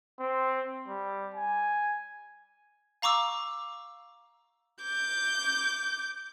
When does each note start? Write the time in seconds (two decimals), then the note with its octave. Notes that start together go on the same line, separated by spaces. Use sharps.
0.20 C4
0.88 G3
1.34 G#5
3.02 F5 A#5 C#6 D6 E6
4.84 D6 G6